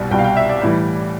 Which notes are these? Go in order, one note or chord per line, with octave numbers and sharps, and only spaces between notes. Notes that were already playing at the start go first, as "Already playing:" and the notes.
Already playing: C2 B2 G3
C2 B2 G3 G5
F5
G5
E5
D5
A2 E3 G3